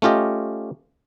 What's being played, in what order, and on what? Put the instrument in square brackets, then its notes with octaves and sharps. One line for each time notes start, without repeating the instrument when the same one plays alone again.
[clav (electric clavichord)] A3 C#4 F4 G4 D#5